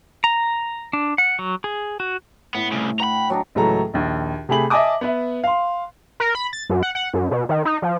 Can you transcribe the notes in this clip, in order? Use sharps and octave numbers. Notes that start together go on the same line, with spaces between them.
A#5
D4
F#5
F#3
G#4
F#4
A2 B3
C2 C#3
F#5 G5 A#5 B5
F#3 D4 D#4
C#2 A2 E3 F#3 A4 A#5
A#1 D#2
C3 A3 G4 G#4 B5 F#7
D#5 E5 G#5 A5 D6 D#6
B3 B4 E5
F5 C6
A#4
B5
A6
F#2
F#5
F#5
F#2
B2
D#3
D#4
F3